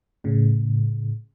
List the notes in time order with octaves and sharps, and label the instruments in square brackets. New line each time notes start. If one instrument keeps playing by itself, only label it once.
[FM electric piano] A2 C#3